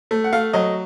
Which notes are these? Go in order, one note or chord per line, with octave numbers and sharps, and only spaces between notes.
A3
F#5
A3 F5
F#3 D#5